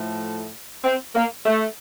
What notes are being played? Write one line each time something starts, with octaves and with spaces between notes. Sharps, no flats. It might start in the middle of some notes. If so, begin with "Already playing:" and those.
Already playing: A2 F3 A3
C4
A#3
A3